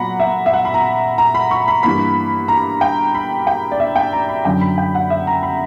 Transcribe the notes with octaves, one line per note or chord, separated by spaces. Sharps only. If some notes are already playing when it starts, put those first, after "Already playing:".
Already playing: A#2 F#3 A#3 F#5 A#5 B5
E5
E5
F#5
B5
A#5
A#5
B5
C#6
B5
G2 E3 A#3 B5
A#5
G5
B5
G5
D5
E5
G5
A#5
B5
F#2 D3 F#3 G5
B5
G5
F#5
E5
A#5
B5